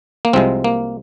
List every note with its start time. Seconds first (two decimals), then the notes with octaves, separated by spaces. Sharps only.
0.25 A#3
0.33 C2 C3 F3 G#3 C4
0.64 A#3